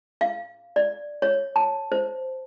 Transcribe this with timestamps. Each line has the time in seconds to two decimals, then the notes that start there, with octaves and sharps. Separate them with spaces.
0.21 F5
0.76 D5
1.22 C#5
1.56 A5
1.92 C5